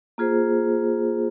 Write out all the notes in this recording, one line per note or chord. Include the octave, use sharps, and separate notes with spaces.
A#3 F4 G#4 C5